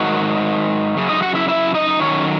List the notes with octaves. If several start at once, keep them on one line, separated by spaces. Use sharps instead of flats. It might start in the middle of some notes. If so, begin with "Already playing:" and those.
Already playing: G#2 D#3 F#3 F#4 F#5
F#2 C#3
D#4 D#5
F#4 F#5
E4 E5
E4 E5
D#4 D#5
F#2 D#3 F#3 C#4 C#5